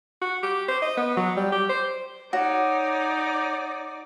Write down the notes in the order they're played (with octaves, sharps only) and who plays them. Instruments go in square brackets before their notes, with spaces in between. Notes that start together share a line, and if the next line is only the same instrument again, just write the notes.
[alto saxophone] F#4
G4
C5
D#5
B3
F#3
G3
G4
C5
[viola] D#4 D5 [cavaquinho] F#4 [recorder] C#5